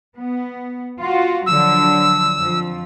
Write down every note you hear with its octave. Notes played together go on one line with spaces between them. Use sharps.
B3
F4 F#4
D3 F3 F#3 E6
F2 F3